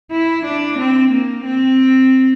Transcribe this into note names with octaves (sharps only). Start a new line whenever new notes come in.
E4
D4
C4
A#3
C4